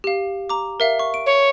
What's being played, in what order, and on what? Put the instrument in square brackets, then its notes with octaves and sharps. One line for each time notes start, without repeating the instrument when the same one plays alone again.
[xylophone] G4 F5
A#5 D6
A#4 E5 F5
C#6
D7
[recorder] C#5